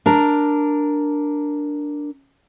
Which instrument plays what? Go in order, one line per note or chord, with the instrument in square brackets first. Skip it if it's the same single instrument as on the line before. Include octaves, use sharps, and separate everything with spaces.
[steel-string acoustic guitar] D4 A#4 A#5